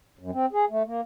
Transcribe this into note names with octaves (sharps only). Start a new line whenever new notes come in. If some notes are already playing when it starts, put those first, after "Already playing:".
F#2
C4
G#4
A3
A#3